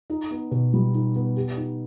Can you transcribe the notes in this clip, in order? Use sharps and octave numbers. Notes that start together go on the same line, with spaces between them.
D#4
B3
B2
G3
D#4
B3
G4
D#4